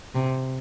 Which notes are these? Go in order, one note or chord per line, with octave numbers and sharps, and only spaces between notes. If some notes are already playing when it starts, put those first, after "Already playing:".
C3